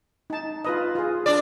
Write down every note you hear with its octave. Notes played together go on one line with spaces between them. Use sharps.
D#4 A5
F4 B4 D#5
F4 G#4
D4 D5